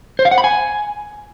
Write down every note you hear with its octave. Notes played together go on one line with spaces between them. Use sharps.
C5
F5
F#5
B5
G#5